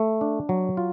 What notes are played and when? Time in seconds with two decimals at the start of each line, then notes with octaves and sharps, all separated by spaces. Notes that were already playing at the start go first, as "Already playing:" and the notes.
Already playing: A3
0.21 D4
0.49 F#3
0.77 F4